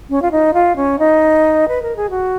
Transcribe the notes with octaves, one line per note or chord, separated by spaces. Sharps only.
C#4
F4
D#4
F4
C#4
D#4
B4
A#4
G#4
F#4